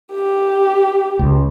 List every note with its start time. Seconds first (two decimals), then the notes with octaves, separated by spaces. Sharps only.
0.13 G4
1.19 C#2